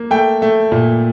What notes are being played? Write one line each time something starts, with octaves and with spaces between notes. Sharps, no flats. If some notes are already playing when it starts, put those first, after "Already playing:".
Already playing: A#3
A3 G5
A3
A#2